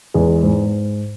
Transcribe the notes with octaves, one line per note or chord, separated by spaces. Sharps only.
E2 G#3
G#2